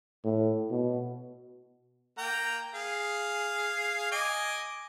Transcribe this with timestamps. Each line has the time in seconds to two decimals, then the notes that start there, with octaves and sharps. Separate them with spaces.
0.25 A2
0.71 B2
2.18 A#3 G5 A#5
2.75 G#4 F5
4.12 D#5 G#5 D6